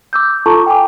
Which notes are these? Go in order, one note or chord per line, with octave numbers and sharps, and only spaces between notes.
D6 E6 G6
F4 A4 A5 A#5 C#6
G5 G#5 D6